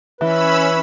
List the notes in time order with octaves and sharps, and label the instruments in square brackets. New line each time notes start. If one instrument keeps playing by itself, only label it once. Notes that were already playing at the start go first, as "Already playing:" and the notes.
[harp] E3 [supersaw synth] C#4 B5 E6 [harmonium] B4